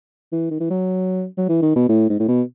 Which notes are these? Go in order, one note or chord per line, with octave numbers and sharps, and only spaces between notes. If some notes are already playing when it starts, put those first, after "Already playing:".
E3
D#3
E3
F#3
F#3
E3
D#3
B2
A2
G#2
A2
B2